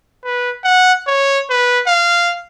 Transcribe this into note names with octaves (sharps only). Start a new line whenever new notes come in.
B4
F#5
C#5
B4
F5